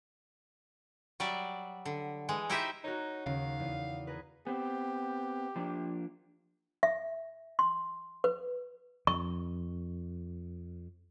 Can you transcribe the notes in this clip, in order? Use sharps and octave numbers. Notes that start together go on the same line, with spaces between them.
F#3 G3 D5 E5
D3
E3 G#3
D#4 E4 G4 C5 D#5 E5
D#4 F#4 A#4 C#5
D#2 C#3 F5
E2
G#4 A#4 B4
B3 C4 G4
F3 A#3 D4
E5
C6
B4
F2 C#6